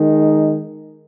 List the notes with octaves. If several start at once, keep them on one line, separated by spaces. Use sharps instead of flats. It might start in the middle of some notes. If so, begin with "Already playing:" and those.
Already playing: D#3 G#3 D#4